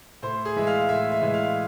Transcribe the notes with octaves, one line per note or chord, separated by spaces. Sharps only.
A2 C5
G#4
E3 G#3 E5
F5
A2 E5
E5
E3 G#3
F5